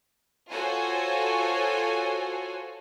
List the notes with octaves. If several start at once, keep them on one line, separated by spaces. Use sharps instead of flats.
F4 F#4 A4 C5 C#5 G#5